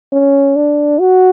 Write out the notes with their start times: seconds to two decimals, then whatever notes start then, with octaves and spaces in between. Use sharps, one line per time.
0.13 C#4
0.56 D4
1.00 F#4